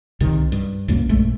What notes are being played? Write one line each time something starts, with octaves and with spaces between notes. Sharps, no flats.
C2 C3 D#3
G2
C2 F#2 A#3
A#1 G#3 A3